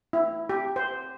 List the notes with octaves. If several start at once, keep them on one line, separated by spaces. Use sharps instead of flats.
E4
G4
C5